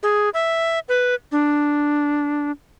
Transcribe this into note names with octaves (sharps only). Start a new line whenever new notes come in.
G#4
E5
B4
D4